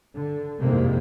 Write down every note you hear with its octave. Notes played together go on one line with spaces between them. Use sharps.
D3
C2 F2 G#2 C3 G#3 A#3